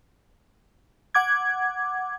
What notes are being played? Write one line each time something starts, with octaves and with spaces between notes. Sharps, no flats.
F#5 D6 G#6